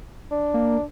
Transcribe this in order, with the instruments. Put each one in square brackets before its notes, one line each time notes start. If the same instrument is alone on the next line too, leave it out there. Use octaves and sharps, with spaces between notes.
[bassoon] D4
[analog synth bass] A#3